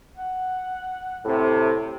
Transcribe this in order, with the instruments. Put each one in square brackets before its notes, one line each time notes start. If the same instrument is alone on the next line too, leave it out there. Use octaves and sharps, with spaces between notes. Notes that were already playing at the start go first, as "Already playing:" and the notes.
[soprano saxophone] F#5
[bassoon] A2 [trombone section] C3